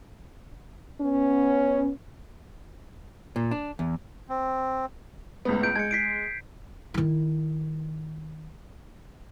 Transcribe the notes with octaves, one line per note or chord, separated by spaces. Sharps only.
B3 C#4
A#2
D4
E2
C4
C#2 A2 B3
G6 D7
G#3 G#6 C#7
B6 C7 D7
D#3 E4